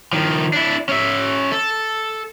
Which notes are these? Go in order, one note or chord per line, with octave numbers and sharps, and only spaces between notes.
D#3 F3
D4 E4
C#4 E5
A4